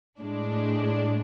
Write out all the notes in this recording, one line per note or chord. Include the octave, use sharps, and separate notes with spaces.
A2 G#3 D4